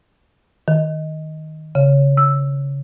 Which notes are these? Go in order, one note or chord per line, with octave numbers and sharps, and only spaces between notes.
D#3
C#3
E6